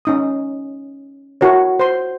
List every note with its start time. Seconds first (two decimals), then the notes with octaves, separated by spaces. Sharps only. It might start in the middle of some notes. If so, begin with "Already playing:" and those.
0.05 C#4 D#4 D#6
1.41 E4 F#4 A#4 C#5
1.79 C5 C6